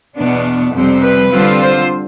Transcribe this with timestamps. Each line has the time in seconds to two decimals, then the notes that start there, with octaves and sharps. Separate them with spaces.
0.16 E2 B2 B3 D4
0.73 F2 C3 G3 C4
1.04 B4
1.32 D3 G3 C4 F4
1.61 C5